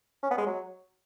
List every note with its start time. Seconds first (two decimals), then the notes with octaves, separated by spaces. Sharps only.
0.23 C#4
0.30 B3
0.38 G#3
0.46 F#3